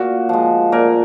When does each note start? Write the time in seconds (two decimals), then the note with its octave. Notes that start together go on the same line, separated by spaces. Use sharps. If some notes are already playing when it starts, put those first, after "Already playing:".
Already playing: A#2 F#4
0.29 F3 G#3
0.72 A#2 A#4